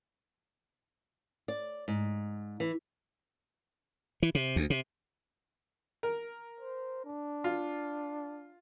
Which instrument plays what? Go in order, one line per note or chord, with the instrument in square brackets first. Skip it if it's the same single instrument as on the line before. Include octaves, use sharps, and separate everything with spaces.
[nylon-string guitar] D5
G#2
E3
[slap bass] E3
C3
D2
C3
[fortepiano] A#4
[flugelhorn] C5
D4
[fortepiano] F4